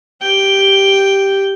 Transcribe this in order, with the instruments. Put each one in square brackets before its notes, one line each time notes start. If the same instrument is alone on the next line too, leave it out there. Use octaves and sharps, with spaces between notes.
[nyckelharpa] G4 G5